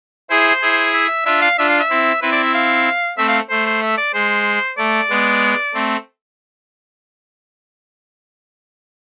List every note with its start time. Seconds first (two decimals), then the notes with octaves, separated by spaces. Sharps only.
0.30 E4 G#4 C5
0.61 E4 G#4
0.94 E5
1.25 D4 F4 E5
1.42 F5
1.58 D4 F4 E5
1.69 F5
1.80 E5
1.90 C4 E4
2.22 C4 E4 B4
2.32 D5
2.43 E5
2.54 F5
3.17 A3 C4 E5
3.28 F5
3.50 A3 C5
3.66 C5
3.82 E5
3.98 D5
4.14 G#3 C5
4.78 A3 D5
5.09 G#3 B3
5.74 A3 C4